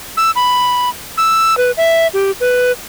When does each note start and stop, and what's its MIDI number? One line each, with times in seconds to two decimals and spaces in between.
0.17 0.31 88
0.36 0.90 83
1.17 1.57 88
1.58 1.71 71
1.77 2.07 76
2.14 2.31 67
2.40 2.72 71